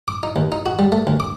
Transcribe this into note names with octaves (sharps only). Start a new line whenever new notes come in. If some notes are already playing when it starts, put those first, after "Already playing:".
D6
D#4
D#2
D#4
F#4
G3
A3
D2
D6